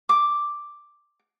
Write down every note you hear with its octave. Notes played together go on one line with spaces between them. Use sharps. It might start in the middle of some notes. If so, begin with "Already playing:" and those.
D6